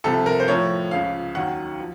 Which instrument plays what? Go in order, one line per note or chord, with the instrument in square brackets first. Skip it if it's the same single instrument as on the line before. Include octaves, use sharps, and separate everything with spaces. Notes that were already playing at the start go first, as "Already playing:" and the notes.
[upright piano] C2 C3 F3 A4
A#4
C5
A2 F3 C#5
C#2 C#3 F3 F5
D#2 D#3 F#3 F#5
F3